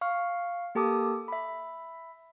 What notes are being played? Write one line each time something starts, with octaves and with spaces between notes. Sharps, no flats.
F5 C#6 F6
A#3 G4 A4 A5 D6 D#6
E5 B5